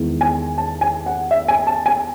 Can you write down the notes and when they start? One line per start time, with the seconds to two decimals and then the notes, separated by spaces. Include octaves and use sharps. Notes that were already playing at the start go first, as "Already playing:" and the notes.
Already playing: E2 D#3 G#3
0.21 G#5
0.58 A5
0.81 G#5
1.06 F#5
1.31 E5
1.48 G#5
1.67 A5
1.86 G#5